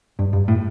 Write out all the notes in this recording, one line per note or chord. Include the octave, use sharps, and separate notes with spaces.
G2
G2
A2